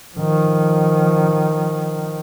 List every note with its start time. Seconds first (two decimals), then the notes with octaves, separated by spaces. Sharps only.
0.16 D#3 F3